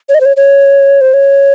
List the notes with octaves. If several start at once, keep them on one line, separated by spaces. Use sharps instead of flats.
C#5
D#5
C5
C#5
C#5
C5
C#5